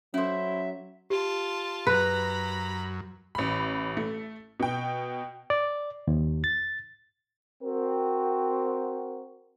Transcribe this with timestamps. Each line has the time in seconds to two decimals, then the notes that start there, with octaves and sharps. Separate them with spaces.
0.14 F#3 C#4 E4 A4 C5 E5
1.10 F4 G4 A5
1.87 F#2 B4 A#5 B5
3.35 A1 B5
3.97 A3
4.60 B2 G5
5.50 D5
6.07 D#2
6.44 A6
7.64 C4 F#4 A#4